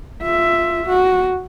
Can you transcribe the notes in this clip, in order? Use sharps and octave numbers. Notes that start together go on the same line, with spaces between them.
F4 E5
F#4